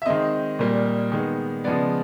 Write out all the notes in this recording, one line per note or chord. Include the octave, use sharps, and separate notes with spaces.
E5
D#3 G#3 C4 D#5
A#2 G3 A#3
D#3 G#3 B3
C#3 F3 G#3 B3 D5